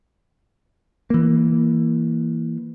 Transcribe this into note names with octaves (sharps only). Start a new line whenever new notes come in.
E3 A#3